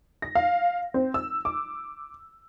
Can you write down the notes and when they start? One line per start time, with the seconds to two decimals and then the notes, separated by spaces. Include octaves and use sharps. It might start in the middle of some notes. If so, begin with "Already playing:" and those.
0.22 A#6
0.35 F5
0.94 C4
1.14 E6
1.45 D6